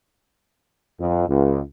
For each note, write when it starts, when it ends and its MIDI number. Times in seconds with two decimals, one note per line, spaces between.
1.00 1.27 41
1.28 1.60 37